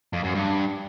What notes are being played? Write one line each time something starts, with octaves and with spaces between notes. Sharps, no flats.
F2
F#2
G2